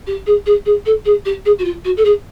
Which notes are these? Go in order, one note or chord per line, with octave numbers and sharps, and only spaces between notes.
G4
G#4
G#4
G#4
A4
G#4
G4
G#4
F#4
F4
F#4
A4
G#4